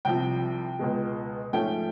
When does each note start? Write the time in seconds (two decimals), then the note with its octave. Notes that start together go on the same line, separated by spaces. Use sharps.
0.05 C2 C3 F3 G5
0.79 C#2 B2 G#3
1.53 G#2 F3 A3 C#4 G5